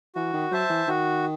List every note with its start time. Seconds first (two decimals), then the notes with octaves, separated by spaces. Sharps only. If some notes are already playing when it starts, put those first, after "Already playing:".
0.15 E3 F#4
0.33 D#3
0.51 F#3 C5 E5 A5
0.70 E3
0.88 D#3 F#4